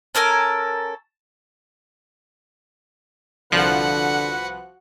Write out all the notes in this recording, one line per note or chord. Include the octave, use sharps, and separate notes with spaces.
C#4 A4 A#4 G#5
C2 D3 F3 F#4 B4 F#5 F#6